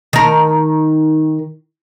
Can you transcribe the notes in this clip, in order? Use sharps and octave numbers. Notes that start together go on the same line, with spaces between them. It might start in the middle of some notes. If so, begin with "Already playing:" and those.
D#3 A#4